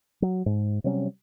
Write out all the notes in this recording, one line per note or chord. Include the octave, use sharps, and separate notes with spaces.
F#3
G#2
C3 F#3 G3 C#4